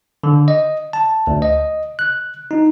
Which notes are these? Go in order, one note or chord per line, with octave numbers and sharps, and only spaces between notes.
D3
D#5
A5
D2
D#5
F#6
D#4